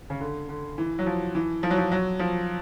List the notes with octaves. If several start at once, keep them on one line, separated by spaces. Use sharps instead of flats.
C#3
D3
D3
E3
F#3
F3
E3
F3
F#3
F3
F#3
F3